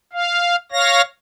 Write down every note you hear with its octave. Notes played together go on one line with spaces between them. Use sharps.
F5
C#5 F5 A#6